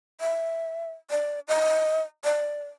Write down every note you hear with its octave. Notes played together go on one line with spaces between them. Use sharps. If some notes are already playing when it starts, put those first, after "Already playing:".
E5
D5
D#5
D5